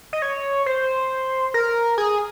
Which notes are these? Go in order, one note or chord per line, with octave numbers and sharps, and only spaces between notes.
D#5
C#5
C5
A#4
G#4